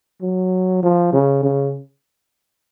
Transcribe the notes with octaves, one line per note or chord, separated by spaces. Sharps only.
F#3
F3
C#3
C#3